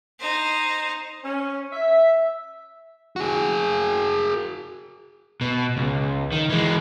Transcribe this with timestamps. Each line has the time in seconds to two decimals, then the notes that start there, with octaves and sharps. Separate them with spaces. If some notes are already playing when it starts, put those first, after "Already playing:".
0.19 D#4 C5
1.24 C#4
1.72 E5
3.16 F#4 G#4
5.41 B2
5.77 C#2
6.32 D#3
6.50 E3 G#3